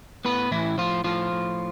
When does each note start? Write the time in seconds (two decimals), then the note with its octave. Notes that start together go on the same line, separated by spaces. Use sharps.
0.25 A2 B3 B4
0.51 A2 E3 E4
0.78 A2 F3 F4
1.04 A2 F3 F4
1.32 A2